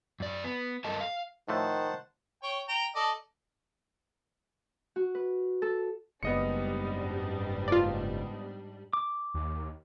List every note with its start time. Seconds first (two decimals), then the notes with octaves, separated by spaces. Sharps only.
0.20 F#2 D5
0.44 B3
0.84 G2 A4 A#4 D#5 A5
1.00 F5
1.49 A2 D#3 F3 A3 C5 F#5 A5
2.43 C#5 G5
2.69 G5 A#5
2.96 A4 D5 D#5
4.96 F#4
5.15 B4
5.62 A4
6.23 F#1 G#2 G3 B3 D4 D#5 C#7
7.68 F4 D5
8.93 D6
9.34 D#2